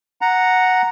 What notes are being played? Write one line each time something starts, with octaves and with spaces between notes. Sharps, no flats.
F#5 A#5